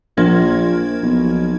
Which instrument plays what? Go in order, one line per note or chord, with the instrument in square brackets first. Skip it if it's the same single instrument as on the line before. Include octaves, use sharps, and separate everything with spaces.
[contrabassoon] A#1 [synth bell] F3 A#3 G#6
[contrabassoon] B1